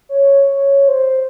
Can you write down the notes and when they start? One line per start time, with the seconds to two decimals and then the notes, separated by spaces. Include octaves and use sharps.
0.09 C#5
0.88 C5